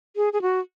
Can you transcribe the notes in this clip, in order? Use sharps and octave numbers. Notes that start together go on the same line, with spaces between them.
G#4
G#4
F#4